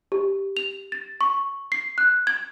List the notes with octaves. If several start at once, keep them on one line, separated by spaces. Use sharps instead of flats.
G4
F7
A6
C#6
C7
F#6
G#6